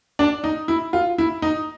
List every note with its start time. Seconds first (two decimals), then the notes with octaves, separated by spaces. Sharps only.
0.19 D4
0.44 D#4
0.68 E4
0.93 F4
1.18 E4
1.42 D#4